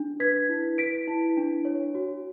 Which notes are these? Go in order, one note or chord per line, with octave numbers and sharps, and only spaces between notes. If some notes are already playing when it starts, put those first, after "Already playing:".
Already playing: D4
B4 G#6 B6
E4
B4 B6 D7
E4
D4
C#5
F#4